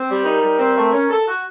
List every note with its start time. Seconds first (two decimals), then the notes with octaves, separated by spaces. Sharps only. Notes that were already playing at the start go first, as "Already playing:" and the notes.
Already playing: C4
0.09 G3
0.24 D#4 A#4
0.42 G3
0.58 C4
0.76 A3
0.92 C#4
1.10 A4
1.28 F#4